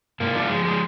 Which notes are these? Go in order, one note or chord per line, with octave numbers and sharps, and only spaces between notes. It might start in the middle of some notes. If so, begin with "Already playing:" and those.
G#2 A#3
D4 F4
F3 G#3
G#3